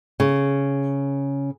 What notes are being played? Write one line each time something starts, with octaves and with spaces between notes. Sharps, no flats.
C#3